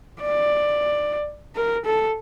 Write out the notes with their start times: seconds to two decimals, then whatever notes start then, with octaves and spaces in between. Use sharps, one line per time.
0.21 D5
1.56 A#4
1.85 A4